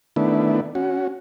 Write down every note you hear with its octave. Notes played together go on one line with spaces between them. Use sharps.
D#3 A3 B3 D4 E4
C#4 F#4